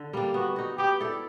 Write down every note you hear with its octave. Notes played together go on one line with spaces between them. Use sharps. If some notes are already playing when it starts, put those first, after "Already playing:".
Already playing: D3
G3 A#3 D4
B3 F#4
D#4 F#4
B3 G4
E4 A4 D5